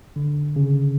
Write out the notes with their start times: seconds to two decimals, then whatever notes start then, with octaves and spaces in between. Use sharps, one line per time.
0.16 D3
0.56 C#3